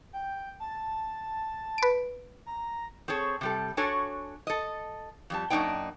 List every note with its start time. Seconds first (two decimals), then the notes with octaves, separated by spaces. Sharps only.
0.13 G5
0.60 A5
1.78 B4 D7
2.46 A#5
3.08 C4 G#4 A4 C#5
3.41 C3 G3 A4
3.77 D4 F#4 A4 C#5 G#5
4.47 A4 D#5
5.30 F2 G3 A5
5.50 F#2 A#3 B3 D4 D#4 G5